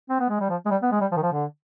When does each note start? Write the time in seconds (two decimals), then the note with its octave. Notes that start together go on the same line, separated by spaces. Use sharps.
0.10 C4
0.20 B3
0.30 G#3
0.40 G3
0.50 F3
0.66 G#3
0.71 G3
0.83 B3
0.92 G#3
1.01 G3
1.12 F3
1.17 D#3
1.23 F3
1.32 D3